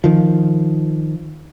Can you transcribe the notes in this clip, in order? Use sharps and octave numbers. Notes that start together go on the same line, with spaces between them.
D#3 F3